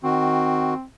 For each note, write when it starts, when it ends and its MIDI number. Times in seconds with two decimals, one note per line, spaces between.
0.04 0.74 51
0.04 0.84 60
0.04 0.74 66